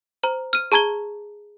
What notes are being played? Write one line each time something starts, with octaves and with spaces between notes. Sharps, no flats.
C5 A#5
F6 D#7
G#4 A5 A#5 G#6 G7